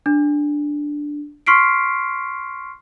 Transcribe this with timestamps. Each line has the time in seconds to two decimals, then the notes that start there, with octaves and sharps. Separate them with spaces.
0.06 D4
1.47 C6 C#6 F6 B6 C7 D7